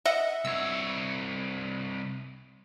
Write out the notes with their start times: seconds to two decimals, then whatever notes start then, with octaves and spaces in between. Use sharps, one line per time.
0.06 D#5 E5 F#5
0.45 C2 C#5 E6